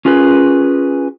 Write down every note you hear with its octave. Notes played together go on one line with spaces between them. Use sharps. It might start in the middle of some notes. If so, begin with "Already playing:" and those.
C#4 F4 G#4 A#4 B4